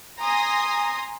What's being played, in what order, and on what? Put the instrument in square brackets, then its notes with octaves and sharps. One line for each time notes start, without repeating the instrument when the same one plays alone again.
[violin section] G#5 A#5 C6 D#6 A#6